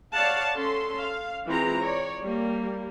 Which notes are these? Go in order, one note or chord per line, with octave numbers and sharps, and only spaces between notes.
C#5 D5 F5 F#5 A5
C#4 A4 C6
F5
E3 G#3 C4 F4 G#4 A#5
C#5 D5
G3 A#3